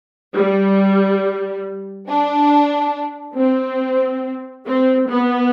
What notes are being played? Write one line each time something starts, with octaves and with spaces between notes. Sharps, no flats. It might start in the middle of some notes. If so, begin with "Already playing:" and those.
G3
D4
C4
C4
B3